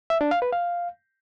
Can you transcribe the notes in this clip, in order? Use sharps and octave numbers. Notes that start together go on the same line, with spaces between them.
E5
D4
F5
B4
F5